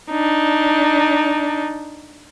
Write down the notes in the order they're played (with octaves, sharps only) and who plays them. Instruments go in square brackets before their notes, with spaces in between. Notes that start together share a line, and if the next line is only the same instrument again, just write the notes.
[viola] D4 D#4